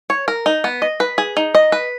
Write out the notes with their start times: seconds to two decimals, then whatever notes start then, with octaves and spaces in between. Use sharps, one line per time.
0.10 C#5
0.28 A#4
0.46 D#4
0.64 B3
0.82 D#5
1.00 B4
1.18 G#4
1.37 D#4
1.55 D#5
1.72 B4